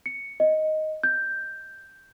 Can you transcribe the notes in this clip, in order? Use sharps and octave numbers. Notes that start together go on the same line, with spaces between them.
C#7
D#5
G6